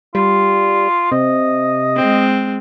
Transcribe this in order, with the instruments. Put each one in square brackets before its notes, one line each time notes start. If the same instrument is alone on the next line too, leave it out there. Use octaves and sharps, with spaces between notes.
[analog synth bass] G3 [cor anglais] F4
[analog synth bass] C3 [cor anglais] D#5
[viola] G#3 C4